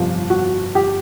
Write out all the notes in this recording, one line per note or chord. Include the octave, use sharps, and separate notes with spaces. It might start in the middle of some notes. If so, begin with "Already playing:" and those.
Already playing: G1 F2 C3 F3
F#4
G4